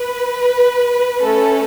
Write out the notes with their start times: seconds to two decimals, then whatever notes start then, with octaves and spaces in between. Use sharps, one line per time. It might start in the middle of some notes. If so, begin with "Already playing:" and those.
Already playing: B4
1.21 A3 C#4 A4